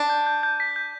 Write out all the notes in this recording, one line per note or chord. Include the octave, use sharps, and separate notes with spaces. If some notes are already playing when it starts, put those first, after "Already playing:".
Already playing: D4
G6
G6
G6
B6
G6